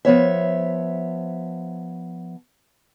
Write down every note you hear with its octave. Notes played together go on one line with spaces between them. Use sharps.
F3 B3 C#5 E5